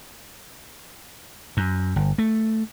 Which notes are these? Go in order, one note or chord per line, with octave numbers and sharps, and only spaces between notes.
F#2
G1
A3